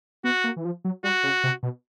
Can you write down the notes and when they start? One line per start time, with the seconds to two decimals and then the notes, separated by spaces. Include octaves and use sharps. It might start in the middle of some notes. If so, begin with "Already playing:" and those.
0.24 B3 F#4
0.44 A#3
0.56 E3
0.65 F3
0.85 F#3
1.04 G3 F#4
1.23 C#3
1.44 C3
1.63 B2